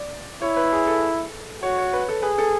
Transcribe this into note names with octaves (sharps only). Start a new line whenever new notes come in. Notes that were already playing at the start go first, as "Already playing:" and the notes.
Already playing: D5
E4 C#5
B4
G#4
A4
F#4 C#5
C#5
B4
A4
G#4 B4
A4